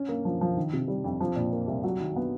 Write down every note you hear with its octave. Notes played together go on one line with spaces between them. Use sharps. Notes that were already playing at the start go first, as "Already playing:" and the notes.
Already playing: C#4
A#3
F3
F3
D#3
C3
G3
F2
F3
A#2
A#3
C2
F#3
D#3
B3